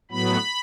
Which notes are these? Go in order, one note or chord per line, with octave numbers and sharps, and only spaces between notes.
A2 F#3 B3 B5